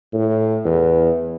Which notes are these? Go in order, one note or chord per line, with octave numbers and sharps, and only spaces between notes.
A2
E2